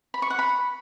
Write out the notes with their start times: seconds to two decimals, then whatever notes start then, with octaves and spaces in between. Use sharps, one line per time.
0.14 B5
0.22 C#6
0.30 F#5
0.39 B5